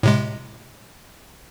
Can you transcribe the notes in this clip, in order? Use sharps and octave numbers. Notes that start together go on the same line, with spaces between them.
A2 C3 G#3